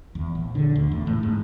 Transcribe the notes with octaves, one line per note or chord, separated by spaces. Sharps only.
E2
A#1
D3
D2
E2
A2
G#2